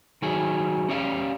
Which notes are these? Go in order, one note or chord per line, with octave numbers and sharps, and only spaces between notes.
D#3 F#3 G#4
C#4 G4 D5 E5 F5